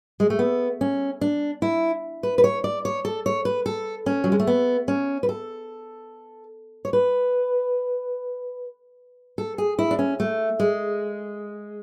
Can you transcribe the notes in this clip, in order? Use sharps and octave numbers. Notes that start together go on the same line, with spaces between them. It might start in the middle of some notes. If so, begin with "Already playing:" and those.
G#3
A3
B3
C#4
D4
E4
B4
B4
C#5
D5
C#5
A4
C#5
B4
A4
C#4
F#3
G#3
A3
B3
C#4
B4
A4
C#5
B4
A4
G#4
E4
D4
C#4
A3
G#3